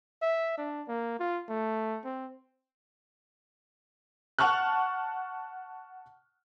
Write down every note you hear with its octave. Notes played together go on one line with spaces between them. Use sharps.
E5
D4
A#3
F4
A3
C4
F#5 A5 C#6 F6 F#6